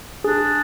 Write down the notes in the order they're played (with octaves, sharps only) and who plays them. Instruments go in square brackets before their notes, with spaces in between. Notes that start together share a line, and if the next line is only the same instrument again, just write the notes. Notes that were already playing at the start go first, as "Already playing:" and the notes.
[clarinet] D4 [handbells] G#4